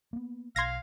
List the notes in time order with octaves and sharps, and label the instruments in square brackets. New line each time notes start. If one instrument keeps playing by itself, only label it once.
[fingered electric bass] A#3 B3
[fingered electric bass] B1 [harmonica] F5 [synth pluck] C6 G#6 A#6